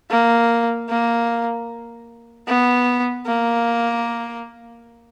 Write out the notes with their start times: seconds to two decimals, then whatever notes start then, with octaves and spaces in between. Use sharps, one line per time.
0.10 A#3
0.89 A#3
2.47 B3
3.26 A#3